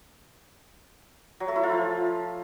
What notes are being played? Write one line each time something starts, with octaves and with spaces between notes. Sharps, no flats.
F#3
A3
E4
F4
F3